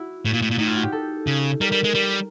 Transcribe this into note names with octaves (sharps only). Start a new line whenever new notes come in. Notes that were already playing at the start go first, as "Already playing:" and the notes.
Already playing: E4 F#4
A2
A#2
A2
A#2
A2 D#4
F4
F#4
G4
A4
C#3
G3 A#4
G3
G#3
G3